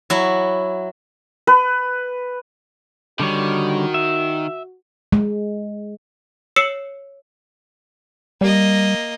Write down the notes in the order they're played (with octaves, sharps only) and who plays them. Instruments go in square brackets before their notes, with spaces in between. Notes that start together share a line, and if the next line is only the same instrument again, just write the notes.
[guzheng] F#3 E4
[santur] B4
[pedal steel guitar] D3 G3 C#5 [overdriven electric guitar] D#3 [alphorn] F#4
[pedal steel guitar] E5
[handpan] G#3
[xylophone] C#5 E6 C7 C#7 E7 F#7
[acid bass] G3 [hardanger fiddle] A#3 D#5